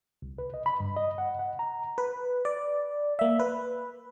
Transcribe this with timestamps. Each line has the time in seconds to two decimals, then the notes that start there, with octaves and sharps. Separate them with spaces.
0.22 C2
0.38 B4
0.54 D#5
0.66 B5
0.80 G2
0.96 D#5
1.18 F#5
1.39 F#5
1.59 A#5
1.98 B4
2.45 D5
3.19 A#3 E5
3.40 B4